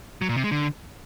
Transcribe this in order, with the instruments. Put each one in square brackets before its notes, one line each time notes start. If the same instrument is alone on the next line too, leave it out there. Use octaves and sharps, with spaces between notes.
[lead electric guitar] F#3
A#2
C3
G#3
D3